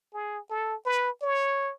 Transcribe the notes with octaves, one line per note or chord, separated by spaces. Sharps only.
G#4
A4
B4
C#5